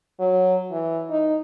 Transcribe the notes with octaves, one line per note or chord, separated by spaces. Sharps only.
F#3
E3
D#4